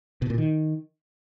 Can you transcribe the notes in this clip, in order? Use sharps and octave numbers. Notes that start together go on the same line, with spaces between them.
B2
A#2
D#3